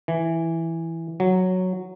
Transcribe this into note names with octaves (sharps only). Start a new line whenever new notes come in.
E3
F#3